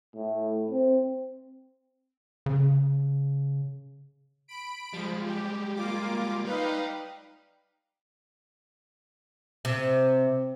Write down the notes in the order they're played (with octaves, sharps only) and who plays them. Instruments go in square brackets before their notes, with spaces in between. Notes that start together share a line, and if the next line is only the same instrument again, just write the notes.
[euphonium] A2
C4
[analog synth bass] C#3
[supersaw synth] B5 D7
[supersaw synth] F3 [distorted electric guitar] G3 G#3
[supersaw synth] G4
A#3 F4 D6
[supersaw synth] D#4 B4 F5 [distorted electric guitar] D5 G5
[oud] C3